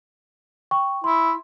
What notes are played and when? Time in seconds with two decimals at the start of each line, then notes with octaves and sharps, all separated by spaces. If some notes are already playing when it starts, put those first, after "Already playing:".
0.71 G5 C#6
1.04 E4 C6